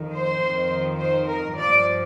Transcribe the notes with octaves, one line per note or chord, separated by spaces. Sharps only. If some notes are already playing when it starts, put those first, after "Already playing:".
Already playing: F2 D#3
C5
F2 D#3
C5
A#4
G2 F3 D5